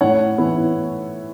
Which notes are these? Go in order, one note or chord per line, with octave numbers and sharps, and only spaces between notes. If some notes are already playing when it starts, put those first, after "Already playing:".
A2 C#5 F#5
E3 B3 E4